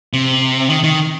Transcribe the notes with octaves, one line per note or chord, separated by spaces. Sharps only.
C3
D#3
D#3